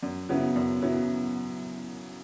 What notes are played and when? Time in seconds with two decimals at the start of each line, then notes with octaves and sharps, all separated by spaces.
0.03 F#2
0.29 C#3 F#3 B3 E4
0.56 F#2
0.82 C#3 F#3 B3 E4